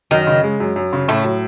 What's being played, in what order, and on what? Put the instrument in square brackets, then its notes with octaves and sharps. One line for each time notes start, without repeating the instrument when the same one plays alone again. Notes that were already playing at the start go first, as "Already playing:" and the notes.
[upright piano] F#2 [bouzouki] D#3
[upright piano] C#3
G#3
F#2
F#2
C#3
[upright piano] A2 [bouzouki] A3
[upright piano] F#3